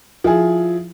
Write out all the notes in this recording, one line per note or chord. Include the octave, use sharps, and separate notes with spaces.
F3 E4 G#4